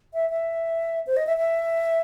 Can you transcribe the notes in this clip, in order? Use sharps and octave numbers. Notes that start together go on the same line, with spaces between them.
E5
E5
C5
D#5
E5
E5